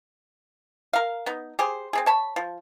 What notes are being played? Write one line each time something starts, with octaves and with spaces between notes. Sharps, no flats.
A#4 F5
B3 D#4
G4 G#4 C5
C4 D4 G#4
C#5 A5 B5
F3